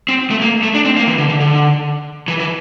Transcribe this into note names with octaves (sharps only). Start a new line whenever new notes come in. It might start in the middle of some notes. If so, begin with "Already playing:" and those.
C4
A3
A#3
A3
D4
C4
A#3
E3
D3
D3
D3
E3
E3